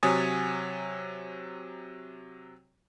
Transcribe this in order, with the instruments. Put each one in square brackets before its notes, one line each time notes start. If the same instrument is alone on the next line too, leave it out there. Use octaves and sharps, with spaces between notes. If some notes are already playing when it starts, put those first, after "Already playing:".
[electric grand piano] C3 F#3 C#5 G#5 D#6 A6